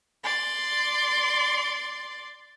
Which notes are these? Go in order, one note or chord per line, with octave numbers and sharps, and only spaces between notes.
D5 C6